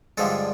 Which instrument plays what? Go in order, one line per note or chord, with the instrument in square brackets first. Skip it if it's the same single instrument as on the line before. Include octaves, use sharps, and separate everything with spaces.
[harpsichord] G2 D3 F3 G#3 A4